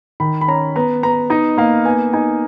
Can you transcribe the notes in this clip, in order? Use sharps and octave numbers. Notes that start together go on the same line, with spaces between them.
D#3 B5
B5
C#4 A#5
B3 A#5
B3 A#5
D#4 D#5
A#3 F5
B3 G#5
D#4 G#5